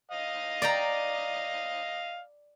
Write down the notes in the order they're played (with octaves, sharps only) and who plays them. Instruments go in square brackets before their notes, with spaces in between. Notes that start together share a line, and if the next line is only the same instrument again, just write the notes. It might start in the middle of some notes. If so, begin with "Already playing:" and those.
[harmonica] D#5 F5 D#6
[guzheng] D5 G5 A#5